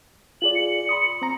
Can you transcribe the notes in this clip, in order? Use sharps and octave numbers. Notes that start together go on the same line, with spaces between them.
F4 G#4 D5 F#7
C#7
B5 C6 D#6
C4 A#5